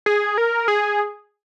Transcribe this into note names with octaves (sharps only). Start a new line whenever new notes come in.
G#4
A#4
G#4